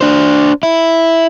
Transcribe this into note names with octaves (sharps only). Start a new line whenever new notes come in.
D4 C5
E4